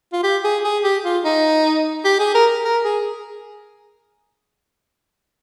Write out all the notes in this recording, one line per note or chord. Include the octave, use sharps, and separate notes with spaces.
F4
G4
G#4
G#4
G4
F4
D#4
G4
G#4
A#4
A#4
G#4